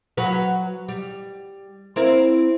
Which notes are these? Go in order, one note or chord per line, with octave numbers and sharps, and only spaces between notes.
F#3 F#4 B4
G3
C4 E4 A#4